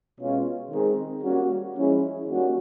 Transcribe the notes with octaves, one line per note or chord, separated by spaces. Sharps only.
B2 G#3 C#4 F4
D#3 G#3 C4 D#4 G#4
G3 A#3 C#4 F#4
F3 G#3 C#4 E4 G#4
D#3 G3 A#3 C#4 F#4